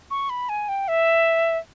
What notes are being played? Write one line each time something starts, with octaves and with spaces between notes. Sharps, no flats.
C#6
B5
G#5
G5
E5